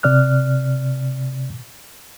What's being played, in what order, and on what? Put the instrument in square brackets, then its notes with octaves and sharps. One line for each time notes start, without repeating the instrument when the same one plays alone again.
[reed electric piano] C3 D5 F6 F#6